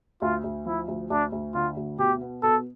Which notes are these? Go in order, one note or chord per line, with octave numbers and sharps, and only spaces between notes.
D2 F4
D2
F3 E4
D2
D2 D4
D2
D3 F4
D2
B2 G4
B3
B2 A4